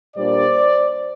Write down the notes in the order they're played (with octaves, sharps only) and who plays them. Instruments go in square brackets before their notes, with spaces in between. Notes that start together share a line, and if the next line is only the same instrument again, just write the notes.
[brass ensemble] A#2 G3 A#3 D4 C5 D5